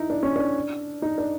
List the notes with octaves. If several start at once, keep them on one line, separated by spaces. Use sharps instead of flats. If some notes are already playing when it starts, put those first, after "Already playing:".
Already playing: D#4 E4
D4
C#4
D4
D#4
D4